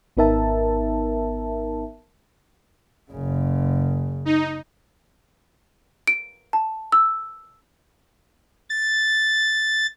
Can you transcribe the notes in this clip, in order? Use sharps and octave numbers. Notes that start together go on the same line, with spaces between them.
G#1 B3 D#4 A#4 E5 A5
F#1 C#3
D#4
D7
A5
E6
A6